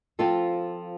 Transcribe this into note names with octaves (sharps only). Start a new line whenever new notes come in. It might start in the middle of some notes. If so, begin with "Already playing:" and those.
F3 C4 F4 A4